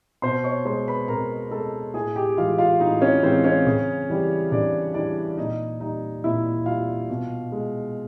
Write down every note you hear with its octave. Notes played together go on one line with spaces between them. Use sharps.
B2 C5 C6
C#5 C#6
G#3 C5 C6
B4 B5
B2 A#4 A#5
G#3 A4 A5
A2 G#4 G#5
G4 G5
E3 G#3 F4 F5
F4 F5
A2 D#4 D#5
C#4 C#5
E3 G#3 C4 C5
C#4 C#5
C#3
E3 G3
C#3 D4 D5
E3 G3 D4 D5
A#2 D#4 D#5
G3 D#4 D#5
A#2 E4 E5
G3 F4 F5
B2
G#3